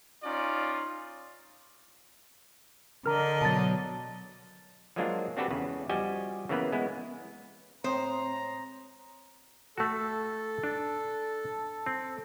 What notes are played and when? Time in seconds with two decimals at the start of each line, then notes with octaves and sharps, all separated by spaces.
0.23 C#4 D#4 F4 D5
3.06 D3 A#4 D#5 A#5 F6
3.41 B2 F#3 A5 A6
4.96 F3 F#3 G#3 A#3 D4 F4
5.37 C4 D4 F#4 G4 A4 B4
5.50 E2 C#3 B4
5.89 F3 G3 F#4 G4 D#5 G#5
6.49 C#3 E3 A#3 B3 B4
6.72 G#3 B3 E4
7.84 A2 G#3 C4 C5 A#5
9.78 A3 F#4 A4
10.64 D4
11.86 C4